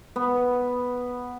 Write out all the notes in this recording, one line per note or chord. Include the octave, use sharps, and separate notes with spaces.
B3